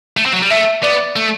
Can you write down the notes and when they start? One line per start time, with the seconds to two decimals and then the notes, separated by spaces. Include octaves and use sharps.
0.17 A3
0.26 C4
0.33 F#3
0.42 G3
0.50 A3 E5
0.83 B3 D5
1.16 A3